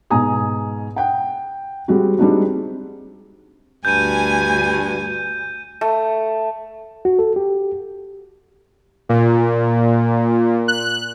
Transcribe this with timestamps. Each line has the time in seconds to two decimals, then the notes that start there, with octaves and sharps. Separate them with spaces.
0.10 G#2 B2 G#5 A#5 D#6
0.96 F#5 G5
1.88 G3 G#3 C4 F#4
2.18 G3 G#3 C4 D4 D#4 F#4
3.85 D2 G2 G#5 G6 D#7
5.81 A3
7.05 F#4
7.19 A4
7.36 G4
9.09 A#2
10.68 F#6